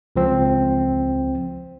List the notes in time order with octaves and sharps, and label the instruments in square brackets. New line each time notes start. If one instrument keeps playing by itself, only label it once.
[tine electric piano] C#2 F3 C4